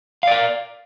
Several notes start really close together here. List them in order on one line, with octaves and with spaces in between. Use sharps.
F5 D5 A#4